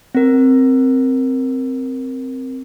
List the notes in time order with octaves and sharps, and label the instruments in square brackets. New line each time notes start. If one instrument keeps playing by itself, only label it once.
[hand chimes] C4 A#4